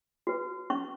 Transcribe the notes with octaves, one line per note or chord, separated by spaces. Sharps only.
F#4 B4
C#4 C#6